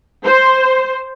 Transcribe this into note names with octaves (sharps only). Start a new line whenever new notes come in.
C5